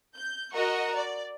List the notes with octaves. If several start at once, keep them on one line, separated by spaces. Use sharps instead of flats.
G6
F#4 A#4 D#5 F#5 A#5 C#6
D5